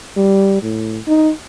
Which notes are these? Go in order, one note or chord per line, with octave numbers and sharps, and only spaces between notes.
G3
A2
D#4